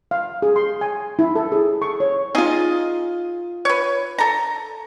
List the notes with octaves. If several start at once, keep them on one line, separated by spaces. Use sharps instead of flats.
F5
G#4
C6
G#5
E4
A4
G#4
C#6
C#5
D#4 F4 G#4 D#5
B4 C#5
A4 A#5